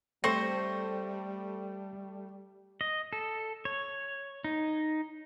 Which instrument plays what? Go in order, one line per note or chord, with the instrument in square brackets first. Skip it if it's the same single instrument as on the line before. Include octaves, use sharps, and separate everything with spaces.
[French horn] G3 [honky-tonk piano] A3 [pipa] C4 C5 [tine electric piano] C#6 A#6
[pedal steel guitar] D#5
A4
C#5
D#4